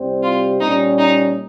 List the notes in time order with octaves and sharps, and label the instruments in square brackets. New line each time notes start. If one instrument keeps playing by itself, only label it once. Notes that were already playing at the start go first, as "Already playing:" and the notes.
Already playing: [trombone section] C2 C3 G3 C4 G4
[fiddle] F4
[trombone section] A#2 G3 C#4 [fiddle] D#4
[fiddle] D#4